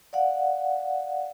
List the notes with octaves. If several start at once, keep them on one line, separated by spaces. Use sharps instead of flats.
D5 F5 F#5